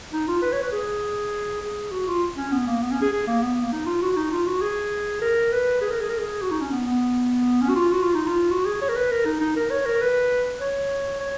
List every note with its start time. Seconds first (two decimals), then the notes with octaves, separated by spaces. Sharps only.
0.13 D#4
0.28 F4
0.42 B4
0.53 C#5
0.63 B4
0.72 G#4
1.62 G#4
1.92 F#4
2.08 F4
2.37 C#4
2.52 B3
2.67 A#3
2.82 B3
2.92 C#4
3.02 G#4
3.12 G#4
3.27 A#3
3.42 B3
3.62 A#3
3.72 D#4
3.86 F4
4.02 F#4
4.16 D#4
4.31 F4
4.47 F#4
4.62 G#4
5.22 A#4
5.52 B4
5.81 G#4
5.91 A#4
6.00 G#4
6.10 A#4
6.18 G#4
6.42 F#4
6.51 D#4
6.61 C#4
6.71 B3
6.86 B3
7.62 C#4
7.69 F#4
7.76 F4
7.92 F#4
8.02 F4
8.15 D#4
8.27 F4
8.51 F#4
8.66 G#4
8.81 C#5
8.89 A#4
8.96 B4
9.11 A#4
9.25 D#4
9.41 D#4
9.56 A#4
9.70 C#5
9.86 A#4
10.01 B4
10.61 C#5
11.20 C#5